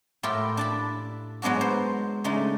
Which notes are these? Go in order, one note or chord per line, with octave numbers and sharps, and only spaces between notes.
A2 E4 F4 G4 A#4
D4 A5 B5
F#3 G#3 B3 D4 F#4
C5
C#3 G#3 A3 D4 D#4